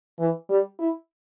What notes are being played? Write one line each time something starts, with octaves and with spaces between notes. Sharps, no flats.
E3
G3
E4